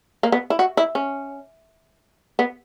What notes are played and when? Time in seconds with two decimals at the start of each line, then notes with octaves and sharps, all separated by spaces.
0.23 A#3
0.32 B3
0.50 E4
0.59 F#4
0.77 E4
0.95 C#4
2.39 B3